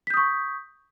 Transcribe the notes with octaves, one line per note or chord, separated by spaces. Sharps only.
C#6 D#6 G6 B6